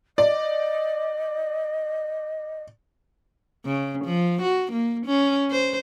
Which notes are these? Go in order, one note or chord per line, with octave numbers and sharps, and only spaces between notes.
D5 D#5
C#3
F3
F#4
A#3
C#4
C5